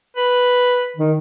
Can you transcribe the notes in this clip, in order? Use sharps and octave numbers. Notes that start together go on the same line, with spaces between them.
B4
D#3